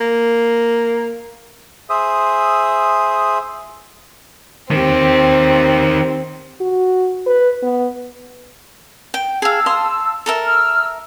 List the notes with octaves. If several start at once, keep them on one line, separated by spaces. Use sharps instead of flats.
A#3
G#4 C5 E5 D#6
D#3 C4 G4
F#4
B4
B3
G5
G#4 F5 A5 E6
F5 C6 D#6
A4 A#4 E5
E6 F6